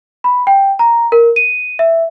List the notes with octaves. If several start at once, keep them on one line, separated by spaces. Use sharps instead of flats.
B5
G5
A#5
A#4
D#7
E5